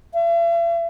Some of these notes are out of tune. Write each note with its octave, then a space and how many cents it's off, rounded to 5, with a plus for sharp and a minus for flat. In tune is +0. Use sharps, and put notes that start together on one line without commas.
E5 +45